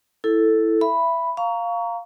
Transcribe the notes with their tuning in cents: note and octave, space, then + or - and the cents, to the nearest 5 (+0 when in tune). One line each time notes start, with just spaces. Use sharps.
E4 +0 A4 +0
E5 +20 B5 +0
F5 +0 A#5 +0 C#6 +25